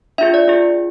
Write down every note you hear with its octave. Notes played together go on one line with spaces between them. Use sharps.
D4 F4 G#4 E5
D5
D4 F4 G#4